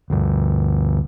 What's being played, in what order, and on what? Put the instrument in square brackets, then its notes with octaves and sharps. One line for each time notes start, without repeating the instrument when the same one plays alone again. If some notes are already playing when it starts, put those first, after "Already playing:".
[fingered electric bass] D2 G2